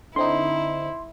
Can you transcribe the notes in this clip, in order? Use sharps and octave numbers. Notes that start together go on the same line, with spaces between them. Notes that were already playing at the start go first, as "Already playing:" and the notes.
D3 C4 D#4 E4 C6